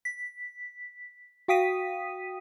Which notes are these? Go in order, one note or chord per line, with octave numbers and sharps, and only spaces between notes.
B6
F#4 F5 G5 D#6 B6 D#7